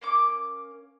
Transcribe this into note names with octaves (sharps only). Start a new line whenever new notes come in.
A#3 C#4 D6